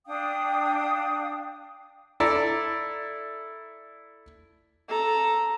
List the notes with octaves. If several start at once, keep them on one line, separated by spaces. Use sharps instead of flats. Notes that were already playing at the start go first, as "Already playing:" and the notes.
D4 F5 G5 D#6
E4 A4 D5 A#5
A4 A#5